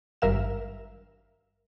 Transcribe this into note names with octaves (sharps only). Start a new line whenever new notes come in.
G#1 G2 A#4 E5 F5 E7